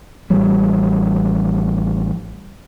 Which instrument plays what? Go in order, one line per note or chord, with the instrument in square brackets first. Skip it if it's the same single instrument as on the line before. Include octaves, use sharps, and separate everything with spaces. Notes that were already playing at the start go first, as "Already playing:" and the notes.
[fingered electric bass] A1 F3 G3